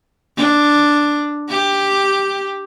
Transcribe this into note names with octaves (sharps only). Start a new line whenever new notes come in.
D4
G4